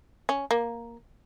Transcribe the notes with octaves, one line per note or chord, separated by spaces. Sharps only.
C#4
A#3